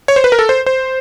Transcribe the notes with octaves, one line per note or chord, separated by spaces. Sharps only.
C#5
C5
B4
A#4
A4
C5
C5